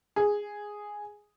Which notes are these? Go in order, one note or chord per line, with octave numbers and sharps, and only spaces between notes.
G#4